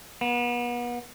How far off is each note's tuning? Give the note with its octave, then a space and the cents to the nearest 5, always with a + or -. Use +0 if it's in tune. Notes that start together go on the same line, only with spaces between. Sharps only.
B3 -35